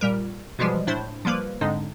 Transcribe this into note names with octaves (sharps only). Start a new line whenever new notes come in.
A#2 G3 A#4
B2 E3 F3 G3 G#3
A2 D4 E4 C5
F3 G3 A#3 B4
G#2 D3 G#3 C4 D4 D#4